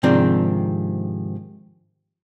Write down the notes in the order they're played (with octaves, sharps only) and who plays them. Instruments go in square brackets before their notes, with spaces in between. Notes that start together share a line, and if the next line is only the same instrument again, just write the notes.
[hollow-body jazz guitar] G#2 C3 D#3 F3 C4 D4